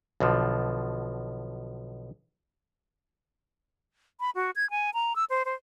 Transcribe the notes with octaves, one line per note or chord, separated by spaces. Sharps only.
B1 B2 D3 F3
B5
F#4
G#6
G#5
A#5
E6
C5
C5